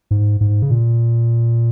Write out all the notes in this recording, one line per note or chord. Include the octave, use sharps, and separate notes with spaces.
G#2
G#2
C#3
A#2